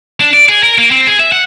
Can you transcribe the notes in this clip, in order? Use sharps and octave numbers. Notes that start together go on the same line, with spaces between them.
D4
D5
G#4
A#4
A#3
C4
G#4
E5
F#5